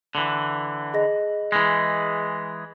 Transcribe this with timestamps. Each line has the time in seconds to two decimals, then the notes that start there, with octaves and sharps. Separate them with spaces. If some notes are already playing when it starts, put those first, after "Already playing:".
0.15 D3 E3
0.93 G#4 D#5 A#6
1.52 E3 G#3